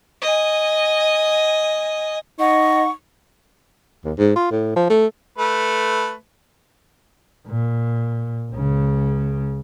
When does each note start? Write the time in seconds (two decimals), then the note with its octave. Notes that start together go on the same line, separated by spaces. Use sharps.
0.22 D#5 G#5
2.39 D#4 D#5 F#5 C#6
4.04 D#2
4.18 G#2
4.36 F4
4.51 A2
4.76 F3
4.90 A3
5.38 A3 B4
7.47 A#2
8.52 C#2 C#3